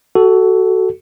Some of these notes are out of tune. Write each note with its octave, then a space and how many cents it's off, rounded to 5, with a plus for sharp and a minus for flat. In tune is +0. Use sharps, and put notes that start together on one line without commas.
F#4 +20 A4 +0